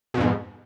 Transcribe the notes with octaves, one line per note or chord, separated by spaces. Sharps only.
F2 G#2 B2